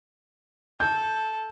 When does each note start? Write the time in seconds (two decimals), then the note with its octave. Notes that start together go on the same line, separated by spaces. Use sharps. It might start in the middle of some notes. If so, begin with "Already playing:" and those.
0.80 A4 G6